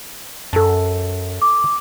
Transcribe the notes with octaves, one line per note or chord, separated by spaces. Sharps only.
F#2 A4 A5
D6